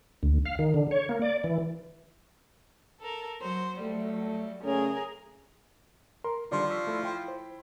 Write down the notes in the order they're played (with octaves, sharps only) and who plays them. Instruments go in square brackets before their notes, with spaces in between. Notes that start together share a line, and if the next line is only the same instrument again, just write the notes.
[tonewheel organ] D2
F5
D#3
D3
C#5
A#3
D5
E3
[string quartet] A4 A#4
F#3 C5
[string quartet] F#3 G3 [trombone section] A3
[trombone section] C#3 A3 C#4 [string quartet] G#4 A#4
[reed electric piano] A#4 [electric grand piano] C6
[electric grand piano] D3 D#3 G3 [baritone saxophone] F3 [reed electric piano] D5 C6
[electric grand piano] C#6 E6 B6
A3 E4 A4
E4 G5 C6
[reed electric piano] C5